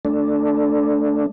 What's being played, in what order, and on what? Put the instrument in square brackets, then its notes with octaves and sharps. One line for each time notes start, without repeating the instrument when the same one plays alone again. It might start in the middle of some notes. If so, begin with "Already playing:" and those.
[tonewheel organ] A3 D4